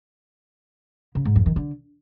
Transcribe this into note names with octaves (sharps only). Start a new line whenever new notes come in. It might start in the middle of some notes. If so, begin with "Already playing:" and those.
C#3
G#2
F2
D#3
D3